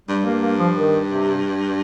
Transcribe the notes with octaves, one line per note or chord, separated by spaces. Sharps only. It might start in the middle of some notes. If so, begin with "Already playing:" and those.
G2 G3
A#3
A#3
F3
D#3
C3